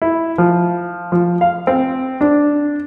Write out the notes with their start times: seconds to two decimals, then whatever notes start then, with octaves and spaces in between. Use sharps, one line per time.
0.02 E4
0.38 F3
1.12 F3
1.41 F5
1.67 C4
2.21 D4